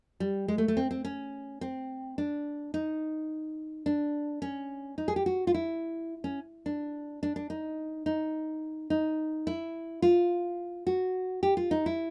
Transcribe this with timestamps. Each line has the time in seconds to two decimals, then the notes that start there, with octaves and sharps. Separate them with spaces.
0.20 G3
0.48 G#3
0.58 A3
0.68 A3
0.77 C4
0.91 C4
1.05 C#4
1.61 C4
2.18 D4
2.74 D#4
3.86 D4
4.42 C#4
4.98 D#4
5.08 G#4
5.16 G4
5.26 F#4
5.47 F4
5.54 E4
6.24 C#4
6.66 D4
7.23 D4
7.36 D4
7.50 D#4
8.06 D#4
8.90 D#4
9.47 E4
10.02 F4
10.87 F#4
11.43 G4
11.57 F4
11.71 D#4
11.86 E4